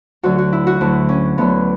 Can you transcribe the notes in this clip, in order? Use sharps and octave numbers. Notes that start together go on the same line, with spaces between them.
D2 D3 F#3 F#4
F#4
E4
F#4
D2 D3 F#3 E4
C#4
D2 D3 F#3 B3